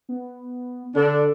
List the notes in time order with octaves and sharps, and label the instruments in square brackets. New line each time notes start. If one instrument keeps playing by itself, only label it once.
[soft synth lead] B3
[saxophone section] D3 D4 [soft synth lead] A4